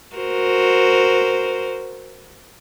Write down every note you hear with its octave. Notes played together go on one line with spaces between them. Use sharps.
F#4 A#4 C5